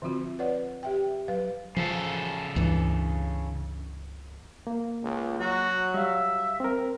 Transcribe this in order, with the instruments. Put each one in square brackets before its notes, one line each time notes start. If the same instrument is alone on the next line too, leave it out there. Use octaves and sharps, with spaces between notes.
[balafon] D3 F3 C4 F4 F#4
B4 C#5 D5 F#5
G4 E5 G5
F#3 B4 F5
[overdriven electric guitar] C#3 A4 [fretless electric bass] F3
[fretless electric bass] C#2 G2 E3
[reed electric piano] A#3
[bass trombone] C#2
[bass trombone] F#3 [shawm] F#4
[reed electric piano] G3 F5 [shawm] E5
[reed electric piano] C4 A#4